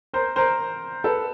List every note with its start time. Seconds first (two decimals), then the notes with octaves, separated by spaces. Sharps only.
0.13 A#4 C5
0.36 A#4 C5
1.04 A4 B4